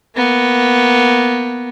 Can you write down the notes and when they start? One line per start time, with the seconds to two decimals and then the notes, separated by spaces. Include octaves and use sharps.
0.16 A#3 B3